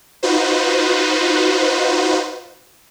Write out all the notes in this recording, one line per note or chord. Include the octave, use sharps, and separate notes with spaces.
D#4 F4 F#4 B4 C5